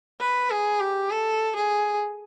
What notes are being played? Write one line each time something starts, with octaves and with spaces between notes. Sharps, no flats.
B4
G#4
G4
A4
G#4